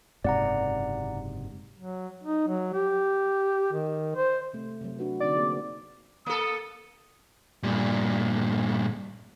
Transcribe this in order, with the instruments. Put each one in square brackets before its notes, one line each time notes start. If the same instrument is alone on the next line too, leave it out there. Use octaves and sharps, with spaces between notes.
[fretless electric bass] F#1 G#2 C3 [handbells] D5 F#5 A#5
[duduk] F#3
D#4
F#3
G4
D#3
C5
[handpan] C3 A3
C3 F#3
D4 F#4 B4
[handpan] D3 C4 D#4 [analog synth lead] D5
[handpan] A#3 C4 G#4
[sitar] A#3 A4 [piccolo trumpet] D#6
[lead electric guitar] G2 A#2